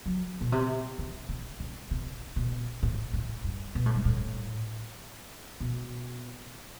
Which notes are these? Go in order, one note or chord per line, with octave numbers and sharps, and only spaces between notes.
F#3
B2
C3
C3
C3
D3
C3
B2
A2
A2
G2
B2
A2
G2
A2
B2